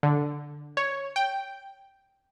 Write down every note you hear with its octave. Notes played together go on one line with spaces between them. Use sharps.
D3
C#5
G5